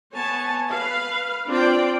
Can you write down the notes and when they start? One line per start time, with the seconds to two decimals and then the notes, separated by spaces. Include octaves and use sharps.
0.12 B3 C#5 G#5 A5
0.71 B4 F5
1.49 C4 D4 F4 C5 D5 G5